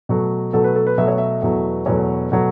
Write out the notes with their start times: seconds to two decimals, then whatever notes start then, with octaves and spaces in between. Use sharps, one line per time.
0.09 B2 F#3 A3
0.53 B2 F#3 A3 A4
0.64 B4
0.76 A4
0.87 B4
0.98 B2 F#3 A3 E5
1.08 C#5
1.18 E5
1.42 E2 B2 F#3 A3
1.86 E2 B2 F#3 A3 C#5
2.32 B2 F#3 A3